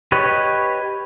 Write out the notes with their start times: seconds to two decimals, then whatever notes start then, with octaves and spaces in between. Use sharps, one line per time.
0.12 G4 B4 C#5 D#5